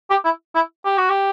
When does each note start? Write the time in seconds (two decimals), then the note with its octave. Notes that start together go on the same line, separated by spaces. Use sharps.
0.10 G4
0.24 E4
0.55 E4
0.85 G4
0.98 F#4
1.09 G4